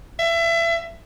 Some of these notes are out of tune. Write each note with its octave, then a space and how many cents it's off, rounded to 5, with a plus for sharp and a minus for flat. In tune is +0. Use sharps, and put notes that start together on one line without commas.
E5 +30